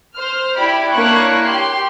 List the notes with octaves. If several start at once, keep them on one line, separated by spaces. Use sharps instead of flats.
C5 F6
E4 G4 D5 B5
A#3 D4 E4 C#5 C#6 F#6
G4 C6